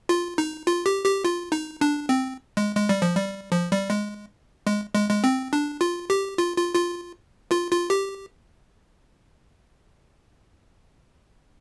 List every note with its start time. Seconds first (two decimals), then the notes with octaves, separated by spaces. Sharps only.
0.09 F4
0.38 D#4
0.67 F4
0.86 G4
1.05 G4
1.24 F4
1.52 D#4
1.81 D4
2.09 C4
2.57 G#3
2.76 G#3
2.89 G3
3.02 F3
3.15 G3
3.52 F3
3.72 G3
3.90 G#3
4.67 G#3
4.95 G#3
5.10 G#3
5.24 C4
5.53 D4
5.81 F4
6.10 G4
6.38 F4
6.56 F4
6.75 F4
7.51 F4
7.72 F4
7.90 G4